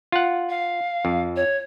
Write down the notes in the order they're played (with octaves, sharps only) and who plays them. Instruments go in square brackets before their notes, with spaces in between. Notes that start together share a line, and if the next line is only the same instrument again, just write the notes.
[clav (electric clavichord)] F4 F#5
[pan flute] F5
[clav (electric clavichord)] F2
[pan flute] C#5